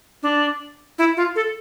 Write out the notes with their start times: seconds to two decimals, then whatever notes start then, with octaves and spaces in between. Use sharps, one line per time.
0.23 D4
0.98 E4
1.17 F4
1.36 A4